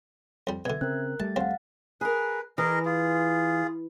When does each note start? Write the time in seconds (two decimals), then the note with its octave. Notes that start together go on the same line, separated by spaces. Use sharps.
0.47 F2 G3
0.65 B2 D3 E5 G#6
0.81 C#3 C4 A#4 F#6
1.20 G3 A3 A5 A6
1.36 D#2 C4 F5 F#5
2.01 G#4 A#4 B4
2.58 E3 G#4 A#4 D#5
2.85 F4 G#4